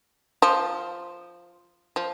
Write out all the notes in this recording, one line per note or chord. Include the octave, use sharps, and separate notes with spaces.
F3
F3